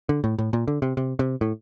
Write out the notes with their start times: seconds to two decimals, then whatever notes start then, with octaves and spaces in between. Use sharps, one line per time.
0.09 D3
0.24 A2
0.38 A2
0.53 A#2
0.68 D3
0.82 C3
0.97 C3
1.19 C3
1.41 A2